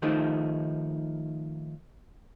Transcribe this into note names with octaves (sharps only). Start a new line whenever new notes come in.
D#3 F3 A3 D#4 G4